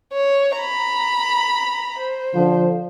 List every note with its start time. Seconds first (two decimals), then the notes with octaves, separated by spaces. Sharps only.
0.14 C#5
0.59 A#5 B5
1.99 C5
2.35 D3 F3